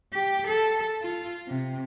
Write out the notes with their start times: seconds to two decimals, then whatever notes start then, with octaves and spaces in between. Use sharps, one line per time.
0.13 G4
0.47 A4
1.02 F4
1.48 C3